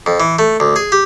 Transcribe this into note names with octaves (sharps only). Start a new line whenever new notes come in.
F2
E3
A3
D2
G#4
G4